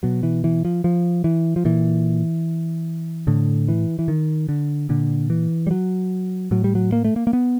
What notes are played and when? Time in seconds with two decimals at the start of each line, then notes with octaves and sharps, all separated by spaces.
0.03 B2 F#3
0.23 E3
0.44 E3
0.65 F3
0.84 F3
1.24 E3
1.56 F3
1.65 A#2 E3
3.27 A2 D3
3.68 E3
3.99 E3
4.08 D#3
4.49 D3
4.89 A#2 D3
5.30 E3
5.67 G3
5.71 F#3
6.51 A2 F#3
6.64 G3
6.75 F#3
6.92 A#3
7.04 A3
7.16 A#3
7.27 A#3
7.33 B3